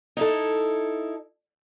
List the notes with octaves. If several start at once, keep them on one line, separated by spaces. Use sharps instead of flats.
D#4 E4 A4